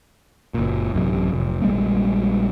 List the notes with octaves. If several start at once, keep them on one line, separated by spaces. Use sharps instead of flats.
F#1 A#2
A1 F#2 A2 C3
F1
A#1 G3 G#3 A#3